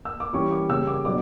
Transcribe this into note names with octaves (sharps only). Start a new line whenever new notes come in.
E6
D6
E3 G3 C#4 C#6
D6
C#3 G3 C#4 E6
D6
B2 F#3 B3 D4 D6